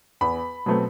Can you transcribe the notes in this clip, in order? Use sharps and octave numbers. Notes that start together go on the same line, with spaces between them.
E2 B5
B2 F#3 A3 C4